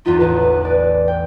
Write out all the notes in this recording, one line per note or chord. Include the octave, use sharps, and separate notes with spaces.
E2 B3 D#4 F4
A1 A2 B4
D5
G5